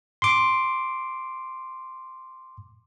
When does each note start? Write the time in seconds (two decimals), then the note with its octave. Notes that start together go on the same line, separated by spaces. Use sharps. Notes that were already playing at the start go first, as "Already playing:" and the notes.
0.22 C6 D6